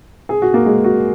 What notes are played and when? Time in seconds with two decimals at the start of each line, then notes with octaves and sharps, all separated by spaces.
0.29 G#4
0.42 F#4
0.54 A#3
0.66 G#3
0.84 F#4